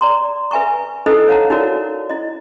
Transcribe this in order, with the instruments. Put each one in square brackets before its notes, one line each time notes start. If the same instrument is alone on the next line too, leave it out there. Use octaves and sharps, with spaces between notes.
[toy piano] D5 A#5 C6
B4 E5 G#5 A#5 C#6
D#4 E4 A4 B4 C5 D#5
C#5 F5 F#5 A5 A#5
D#4 E4 F#4 A#4 C#5 D5
E4 D#5